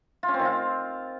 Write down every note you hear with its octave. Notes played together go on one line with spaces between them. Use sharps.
F4
C#4
C4
D#3
F4